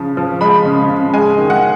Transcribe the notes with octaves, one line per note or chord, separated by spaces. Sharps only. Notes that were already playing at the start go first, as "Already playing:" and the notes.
Already playing: C#3 F3
F3
G#3 B5
C#3
C#3
G#3 G#5
D#3
F#5